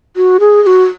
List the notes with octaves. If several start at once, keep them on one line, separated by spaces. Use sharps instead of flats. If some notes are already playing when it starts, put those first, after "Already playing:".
F#4
G#4
G#4
F#4